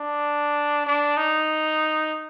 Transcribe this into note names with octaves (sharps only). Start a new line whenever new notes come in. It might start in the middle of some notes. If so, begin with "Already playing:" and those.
Already playing: D4
D4
D#4